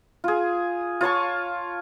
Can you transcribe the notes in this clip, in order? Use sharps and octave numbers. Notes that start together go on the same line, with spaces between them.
F4 G#4
F4 C#5 A5 C#6